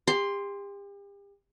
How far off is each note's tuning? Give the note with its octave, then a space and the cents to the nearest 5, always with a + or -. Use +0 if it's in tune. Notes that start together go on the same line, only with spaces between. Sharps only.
G4 +40 C6 +0